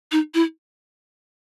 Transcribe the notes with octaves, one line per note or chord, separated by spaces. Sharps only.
D#4
E4